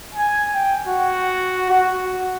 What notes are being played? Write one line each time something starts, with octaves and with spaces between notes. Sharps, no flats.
G#5
G5
F#4
F#4